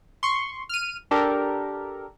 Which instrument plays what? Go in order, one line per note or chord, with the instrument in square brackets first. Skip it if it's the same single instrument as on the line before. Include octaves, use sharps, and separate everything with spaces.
[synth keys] C6 C#6
F6 D#7
D4 G4 A4 A#4